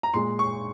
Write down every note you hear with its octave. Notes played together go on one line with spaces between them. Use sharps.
A#5
A#2 G#3 C6
C#6